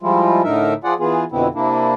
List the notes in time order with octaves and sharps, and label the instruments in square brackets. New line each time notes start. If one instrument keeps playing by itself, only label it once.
[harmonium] F3 G3 G#3 E4 F4
A2 D3 D#4 A#4 E5
F3 F4 G#4 D5 F#5
E3 B3 F4 G#4
F2 B2 D3 B3 C4 E4
C3 A#3 D4 E4